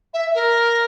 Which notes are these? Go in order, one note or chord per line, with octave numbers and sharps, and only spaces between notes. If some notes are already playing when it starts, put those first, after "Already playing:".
E5
A#4